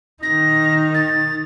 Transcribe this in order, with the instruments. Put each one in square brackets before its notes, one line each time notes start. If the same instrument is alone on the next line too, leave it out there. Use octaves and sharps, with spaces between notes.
[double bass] D#3 D#4 [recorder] A#6
[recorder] A6